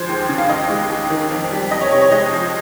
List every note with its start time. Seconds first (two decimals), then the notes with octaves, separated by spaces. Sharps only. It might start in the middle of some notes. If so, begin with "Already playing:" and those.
Already playing: F3 G#3 C5
0.09 D#2
0.29 C#3
0.38 F5
0.49 D#2 D#5
0.70 G#3
0.90 D#2
1.10 D#3
1.30 F2
1.51 G3
1.71 F2 D#5
1.81 C#5
1.92 C3 C#5
2.02 C#5
2.12 G#3 D#5
2.32 F3